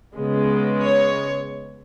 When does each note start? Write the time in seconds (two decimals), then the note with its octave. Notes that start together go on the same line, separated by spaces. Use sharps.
0.16 C#3 G#3 B3
0.82 C#5